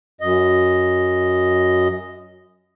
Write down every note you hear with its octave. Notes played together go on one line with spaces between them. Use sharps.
F#2 D#5